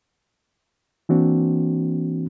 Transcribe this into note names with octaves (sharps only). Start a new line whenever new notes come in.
E3 A#3 C4 D4 F#4